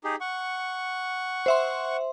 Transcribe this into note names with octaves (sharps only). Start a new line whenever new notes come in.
D#4 G4 G#4
F#5 C#6
C5 E5 C6